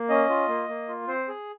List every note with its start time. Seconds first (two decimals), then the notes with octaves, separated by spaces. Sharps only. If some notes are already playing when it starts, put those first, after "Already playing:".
Already playing: A#3
0.09 C#4 D#5
0.29 F4
0.48 A#3
0.68 A#3
0.89 F4
1.08 C4 C5
1.28 G#4